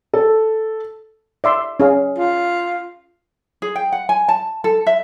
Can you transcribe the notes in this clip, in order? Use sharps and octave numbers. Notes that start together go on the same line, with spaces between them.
A4
D5 E5 C6
C#4 G#4 F5
F4
G#4
G5
F#5
G#5
A5
A4
E5